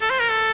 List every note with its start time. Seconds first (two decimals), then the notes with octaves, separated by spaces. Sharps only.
0.01 A4
0.10 C5
0.20 A#4
0.30 A4